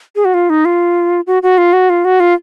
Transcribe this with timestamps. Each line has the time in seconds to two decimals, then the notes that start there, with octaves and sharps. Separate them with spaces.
0.16 G#4
0.25 F#4
0.34 F4
0.50 D#4
0.65 F4
1.27 F#4
1.43 F#4
1.58 F4
1.73 F#4
1.90 F4
2.05 F#4
2.20 F4